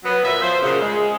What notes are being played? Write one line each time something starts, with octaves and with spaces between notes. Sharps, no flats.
F#3 B3
A#2 E5
F3 C5
F#2 A#2 C#3
G#3